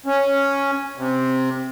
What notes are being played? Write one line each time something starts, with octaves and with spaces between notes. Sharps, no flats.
C#4
C3